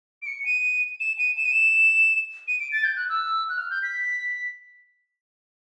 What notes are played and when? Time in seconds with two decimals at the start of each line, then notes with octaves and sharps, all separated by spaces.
0.22 D7
0.26 C#7
0.45 D#7
1.00 E7
1.18 D#7
1.37 E7
1.45 D#7
1.52 E7
2.48 D#7
2.60 D7
2.72 A6
2.84 G6
2.96 F#6
3.09 E6
3.49 F#6
3.58 F6
3.70 G6
3.83 B6